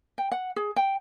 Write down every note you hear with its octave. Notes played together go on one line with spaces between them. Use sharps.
G5
F#5
G#4
G5